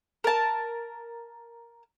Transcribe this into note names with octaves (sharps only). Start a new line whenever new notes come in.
A#4 A5